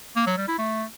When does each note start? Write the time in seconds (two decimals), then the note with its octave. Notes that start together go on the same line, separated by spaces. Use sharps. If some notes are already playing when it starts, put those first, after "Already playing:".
0.16 A#3
0.27 F#3
0.37 G3
0.48 E4
0.59 A3